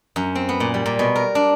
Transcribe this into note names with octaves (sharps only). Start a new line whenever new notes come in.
F#2
C4
B3
A#2
G3
A#2
B2
A#4
D4